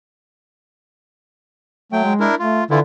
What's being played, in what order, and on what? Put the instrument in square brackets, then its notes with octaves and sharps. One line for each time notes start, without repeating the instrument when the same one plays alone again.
[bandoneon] F#3 G5 [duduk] A3
[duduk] G#3
[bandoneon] D4 E4 A#4
[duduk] A3 [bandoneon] F4
[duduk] D3 [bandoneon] E3 E4 F4